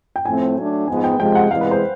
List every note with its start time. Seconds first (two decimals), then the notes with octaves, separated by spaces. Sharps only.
0.16 G5
0.25 A2 F3 A3 C4 G#5
0.56 F#3 A3 D4
0.88 G#2 F3 G#3 B3 G#5
1.04 G5
1.19 C3 F3 G#3 G5
1.35 F#5
1.51 E2 C3 E3 G#3 F5
1.61 B4
1.71 C5